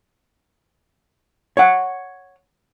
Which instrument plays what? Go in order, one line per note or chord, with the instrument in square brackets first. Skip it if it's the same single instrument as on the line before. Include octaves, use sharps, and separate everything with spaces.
[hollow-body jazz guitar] C#5 F#5